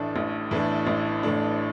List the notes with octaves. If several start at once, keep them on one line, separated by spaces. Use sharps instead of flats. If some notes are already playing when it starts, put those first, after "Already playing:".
Already playing: A1 A2 E3 A3 D4
A1
A2 E3 A3 D4
A1
A2 E3 A3 D4